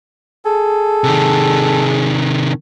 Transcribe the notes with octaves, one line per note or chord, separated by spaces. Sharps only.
G#4 A4
C3 D#3